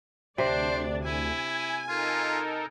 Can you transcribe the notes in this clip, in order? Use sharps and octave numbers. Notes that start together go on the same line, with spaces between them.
D2 C3 D4 C5 D5
E4 G#5
D#4 F4 A4 A#4